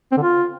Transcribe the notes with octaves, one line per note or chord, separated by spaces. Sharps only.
C4
D3
F4